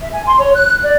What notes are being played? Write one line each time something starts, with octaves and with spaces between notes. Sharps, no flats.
E5
G#5
C6
C#5
F#6
D5